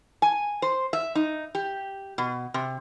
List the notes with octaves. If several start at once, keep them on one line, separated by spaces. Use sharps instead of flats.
G#5
C5
E5
D#4
G4
B2
C3